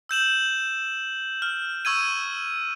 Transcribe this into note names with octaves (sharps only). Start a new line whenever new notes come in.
E6 G6 E7 F#7
F6
C#6 E6 G#6 D#7